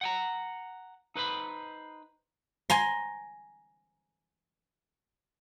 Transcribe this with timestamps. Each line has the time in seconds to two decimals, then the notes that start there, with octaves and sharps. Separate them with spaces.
0.01 F#5 G5 A#5
1.16 D#4 B4 C5 B5
2.70 G#5 A#5 C6